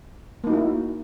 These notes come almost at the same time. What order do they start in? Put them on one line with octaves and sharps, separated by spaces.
A#3 D#4 F#4 E4